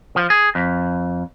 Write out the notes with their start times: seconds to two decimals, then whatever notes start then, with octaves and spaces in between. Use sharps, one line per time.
0.16 F3
0.30 G#4
0.55 F2